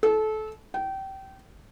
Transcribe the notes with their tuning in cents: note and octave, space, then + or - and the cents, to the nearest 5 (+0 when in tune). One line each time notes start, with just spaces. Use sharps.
A4 -25
G5 -25